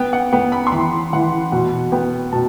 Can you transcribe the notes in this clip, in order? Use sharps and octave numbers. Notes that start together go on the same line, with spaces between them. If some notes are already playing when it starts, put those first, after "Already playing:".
Already playing: B3 G5
F#5
B3 G5
B5
C6
E3 B5
E3 F#5
B2 F#5
B3 G5
B2 A5